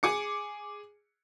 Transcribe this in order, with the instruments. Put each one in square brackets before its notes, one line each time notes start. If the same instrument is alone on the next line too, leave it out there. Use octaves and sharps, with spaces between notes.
[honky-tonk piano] G#4 D6 C#7